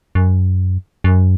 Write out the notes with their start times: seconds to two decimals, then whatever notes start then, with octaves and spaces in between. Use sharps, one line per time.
0.15 F#2
1.04 F#2